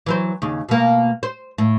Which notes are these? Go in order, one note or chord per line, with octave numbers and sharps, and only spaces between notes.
E3 F#3 C5
D#2 C#3
B2 A#3
C5
A2